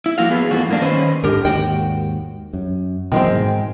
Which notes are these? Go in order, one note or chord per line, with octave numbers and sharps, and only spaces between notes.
E4
F3 A#3 F#4 F5
B3 F4 G#4 B4
F2 A2 E3 F4 F#4
G2 A#3 D4
D#3 C#4 D#4 B4 C5
G#2 D3 G4 A#4
D#2 G#2 F#4 G5
F#2
B2 D#3 E3 F#3 G#3 C4
G#2